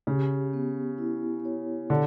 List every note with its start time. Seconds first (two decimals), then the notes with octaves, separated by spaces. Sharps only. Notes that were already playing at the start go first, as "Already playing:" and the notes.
0.07 C#3 G4
0.53 B3
0.98 E4
1.45 C#5
1.90 D3 G4